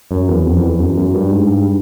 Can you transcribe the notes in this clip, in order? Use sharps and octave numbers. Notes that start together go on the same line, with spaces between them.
F#2
E2
F2
F2
E2
F#2
F#2
G2
G#2
G2